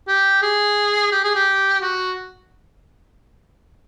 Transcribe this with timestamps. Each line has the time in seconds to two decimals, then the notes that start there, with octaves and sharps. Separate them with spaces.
0.08 G4
0.42 G#4
1.12 G4
1.24 G#4
1.35 G4
1.82 F#4